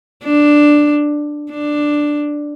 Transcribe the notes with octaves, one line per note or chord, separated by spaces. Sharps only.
D4
D4